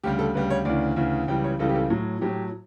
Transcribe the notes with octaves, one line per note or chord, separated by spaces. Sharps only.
D2 C#3 G3 G4
A4
D2 C#3 G3 B4
C#5
D2 C#3 E3 D5
D2 C#3 E3
C#2 C#3 E3 G3 G5
C#5
C#2 C#3 E3 G3 A4
G4
A4
A2 F#3
A2 F#3 G4